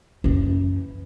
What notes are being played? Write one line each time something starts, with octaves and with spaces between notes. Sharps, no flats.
F#2 E3